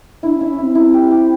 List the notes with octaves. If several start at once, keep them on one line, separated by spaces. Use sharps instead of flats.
D4 E4
C#4
E4
C#4
C4 E4
C4 E4
G4
G4